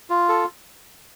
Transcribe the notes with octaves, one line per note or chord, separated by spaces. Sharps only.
F4
A4